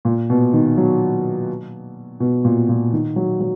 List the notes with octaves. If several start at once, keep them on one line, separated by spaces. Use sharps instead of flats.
A#2
B2
D#3
F#3
B2
A#2
A#2
D#3
F#3
F#3